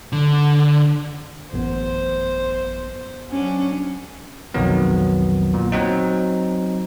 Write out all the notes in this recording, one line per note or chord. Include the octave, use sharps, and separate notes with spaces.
D3
A1 F#2 B3 C5
F#3 C#4 D4
B1 F2 D#3 F#3 B3
A#2
F#3 C4 D#4